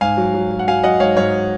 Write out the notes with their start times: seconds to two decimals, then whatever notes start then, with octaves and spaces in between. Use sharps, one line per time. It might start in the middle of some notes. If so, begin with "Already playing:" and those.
0.01 G#2 F5 G#5
0.17 F#3
0.34 F#3
0.51 F#3
0.59 F#5
0.68 F#3 F5 G#5
0.84 F#3 D#5 F#5
1.00 G#2 C#5 F5
1.17 G#2 C#5 F5